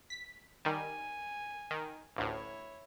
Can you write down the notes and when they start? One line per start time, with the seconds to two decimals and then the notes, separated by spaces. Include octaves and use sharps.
0.10 B6
0.65 D#3 G3 G#5
1.71 D#3
2.16 A1 D2 A2 E4 C#5